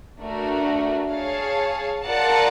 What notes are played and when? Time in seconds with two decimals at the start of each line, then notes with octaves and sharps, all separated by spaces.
0.20 A3 D4 F#4 A#4
1.12 G#4 C#5 F5 A5
2.05 F4 A#4 D5 F#5 A5